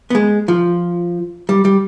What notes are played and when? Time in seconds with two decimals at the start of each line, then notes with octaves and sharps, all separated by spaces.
0.10 B3
0.15 G#3
0.48 F3
1.49 G3
1.65 G3